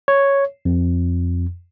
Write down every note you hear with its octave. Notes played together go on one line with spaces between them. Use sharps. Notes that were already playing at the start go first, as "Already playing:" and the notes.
C#5
F2